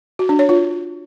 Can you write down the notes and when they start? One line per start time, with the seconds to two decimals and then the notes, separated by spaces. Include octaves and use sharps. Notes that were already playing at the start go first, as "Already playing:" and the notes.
0.19 F#4
0.29 D4
0.39 C#5
0.49 F4